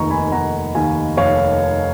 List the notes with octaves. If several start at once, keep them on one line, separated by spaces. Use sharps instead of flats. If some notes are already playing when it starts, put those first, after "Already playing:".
Already playing: F1 D#2 D#3 A#5 C#6
G#5 B5
F1 F#5 A#5
D#2 D#3 F5 G#5
F1 C#5 F5